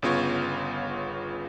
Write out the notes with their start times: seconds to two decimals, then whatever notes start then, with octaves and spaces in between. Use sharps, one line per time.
0.02 G1 C#3 B3 F4 C#5